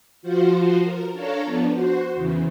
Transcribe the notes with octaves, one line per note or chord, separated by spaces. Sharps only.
F3 F4 F#4 C5
A#4
D4 A4 C#5 F5 A#5
F3 B3 D4
F#4 C5
E2 C#3 E3